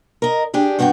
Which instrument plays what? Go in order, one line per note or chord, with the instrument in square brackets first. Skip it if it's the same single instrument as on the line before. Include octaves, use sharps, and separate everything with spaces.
[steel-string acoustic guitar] A#4 D#5
D4 G4 G#4
G2 B3 F#4 G#4 G5